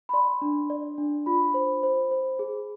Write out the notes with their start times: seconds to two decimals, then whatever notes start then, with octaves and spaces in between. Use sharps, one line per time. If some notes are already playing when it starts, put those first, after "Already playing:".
0.09 B5
0.13 D5 C6
0.42 D4
0.70 D5
0.98 D4
1.26 F4 B5
1.54 C5
1.83 C5
2.11 C5
2.39 G#4